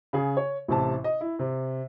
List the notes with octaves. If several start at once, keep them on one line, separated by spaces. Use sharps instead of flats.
C#3 G#4
C#5
A1 C3 A5
D#5
E4
C3